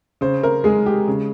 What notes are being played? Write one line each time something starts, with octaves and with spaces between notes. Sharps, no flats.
C#3 C5
A#4
G#3 G#4
G4
C#3